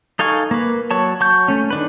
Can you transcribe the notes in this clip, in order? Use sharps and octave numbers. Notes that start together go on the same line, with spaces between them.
D#4 A4 F5 G#5 C#6
A#3 B4
F#3 C#5 A5
F#3 A5 C#6 G6
A3 C#4
D#3 D4 B4